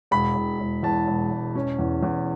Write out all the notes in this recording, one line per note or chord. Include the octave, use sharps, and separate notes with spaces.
E1 B5
E1
E1
E2 A5
E1
E1
C#4
E2
E2